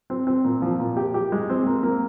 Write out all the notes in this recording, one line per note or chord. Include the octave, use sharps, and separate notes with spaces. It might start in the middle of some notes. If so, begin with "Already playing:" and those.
C4
C4
A#2
F3
A#2
G4
G4
G#3
C4
A#3
A#3